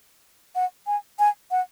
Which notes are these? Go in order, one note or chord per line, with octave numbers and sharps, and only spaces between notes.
F#5
G#5
G#5
F#5